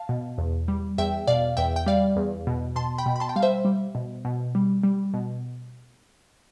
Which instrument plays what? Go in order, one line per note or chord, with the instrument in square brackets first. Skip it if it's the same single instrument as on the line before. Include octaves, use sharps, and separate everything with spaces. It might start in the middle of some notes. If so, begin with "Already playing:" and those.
Already playing: [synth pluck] F5 A5
B2
E2
G3
E2 E5 G5
B2 D5 F5
E2 E5 G5
G5
G3 D5 F5
E2
B2
B2 A5 C6
G5 B5
B2
B5
A5 C6
G5
G3 F5
C5 E5
G3
B2
B2
G3
G3
B2